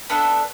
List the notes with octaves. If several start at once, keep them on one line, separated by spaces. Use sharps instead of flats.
B3 D4 A4 E5